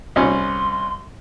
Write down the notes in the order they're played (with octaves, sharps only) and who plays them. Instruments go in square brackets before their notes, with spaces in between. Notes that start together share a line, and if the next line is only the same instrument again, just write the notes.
[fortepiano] C2 C#4 [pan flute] C6